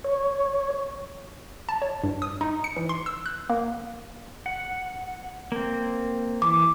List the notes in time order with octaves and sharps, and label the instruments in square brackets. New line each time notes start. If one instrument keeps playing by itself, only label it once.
[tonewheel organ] C#5
[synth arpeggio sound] A5
C#5
G2
D#6
D#4
C#7
E3
C6
E6
F#6
A#3
[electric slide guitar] F#5
A#3 C4
[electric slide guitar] E3 [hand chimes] D6